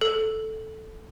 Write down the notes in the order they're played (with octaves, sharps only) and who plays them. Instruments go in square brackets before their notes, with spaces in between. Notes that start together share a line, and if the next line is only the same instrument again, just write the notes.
[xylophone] A4